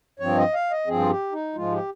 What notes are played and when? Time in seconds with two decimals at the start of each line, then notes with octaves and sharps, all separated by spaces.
0.20 G2 F3 C4 C#5
0.37 D#5
0.54 F5
0.71 D#5
0.87 G2 F3 C4 G#4
0.99 F4
1.10 G4
1.32 D#4
1.55 G#2 F3 G#3 F4
1.72 G4